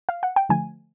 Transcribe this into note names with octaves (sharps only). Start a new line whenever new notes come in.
F5
F#5
G5
D3 F3 A3 G#5